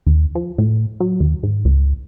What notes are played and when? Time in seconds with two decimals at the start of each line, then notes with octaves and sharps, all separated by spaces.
0.06 D#2
0.35 F3
0.58 A2
1.00 F#3
1.20 D#2
1.43 G#2
1.65 C#2